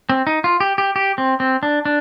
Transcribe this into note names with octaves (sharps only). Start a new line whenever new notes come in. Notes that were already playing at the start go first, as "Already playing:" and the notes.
C4
D#4
F4
G4
G4
G4
C4
C4
D4
D4